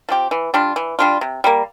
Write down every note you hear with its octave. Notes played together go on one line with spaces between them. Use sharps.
F3 C4 G4
E3
G3 D4 F4
E3
G3 D4 F4
C3
G3 A#3